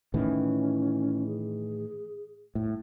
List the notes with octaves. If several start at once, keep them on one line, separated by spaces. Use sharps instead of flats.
A2 D#3 E3 C#4
G#4
A2